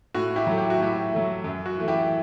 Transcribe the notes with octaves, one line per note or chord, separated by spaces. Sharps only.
A2 F#4
E4 G4
F#3 A3
G4
F#4
A2 E4 G4
F#3 A3
F#2
F#4
E3 A3
E4 G4